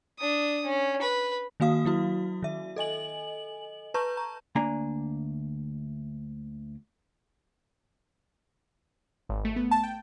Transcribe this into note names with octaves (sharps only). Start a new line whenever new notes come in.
D4 D#6
C#4
B4
D#3 A#3 F#4 F5 D#6
F#3 E4 F#4
D#3 E5
A4 D#5 G#5 F#7
B4 A5 A#5 C#6 G6
A#5
D2 A#3 D4 G#5 A#5
G#1
A3
B3
A5
G5